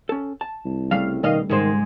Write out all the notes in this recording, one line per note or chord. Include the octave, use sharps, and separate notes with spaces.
C#4 A4
A5
C2
C#3 G3 A3 F5
B2 D#3 D#5 F5
G#2 D#3 G#3 C5